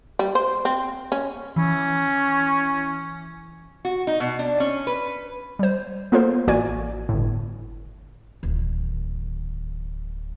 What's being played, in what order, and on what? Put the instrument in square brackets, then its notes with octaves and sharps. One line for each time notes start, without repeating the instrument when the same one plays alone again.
[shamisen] G3
C5
C4
C#4
[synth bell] E3 [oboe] C#4
[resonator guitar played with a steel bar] F#4
D#4
B2
D4
C#4
B4
[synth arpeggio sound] G3 C5
A#3 B3 F4 A4 A#4 C5
A1 A#3 F#4 D5 G#5 G#6
G1 A2
[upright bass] D1 D#3